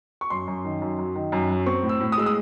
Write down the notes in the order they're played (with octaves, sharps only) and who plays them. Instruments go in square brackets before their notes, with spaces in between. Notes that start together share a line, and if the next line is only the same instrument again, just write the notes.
[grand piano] C#6
F#2 C6
F#2
D#3
F#2
F#3
D#3
F#2
F#3
C4 C#6
A2
E6
A2
D#6
G#3 E6
D#6